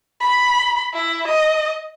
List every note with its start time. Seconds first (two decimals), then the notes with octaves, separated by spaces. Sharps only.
0.20 B5
0.93 E4
1.28 D#5